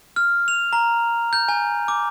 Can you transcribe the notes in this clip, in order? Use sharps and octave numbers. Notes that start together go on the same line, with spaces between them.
F6
F7
A#5
G6
G#5
D6